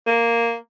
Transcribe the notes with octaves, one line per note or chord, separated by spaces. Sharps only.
A#3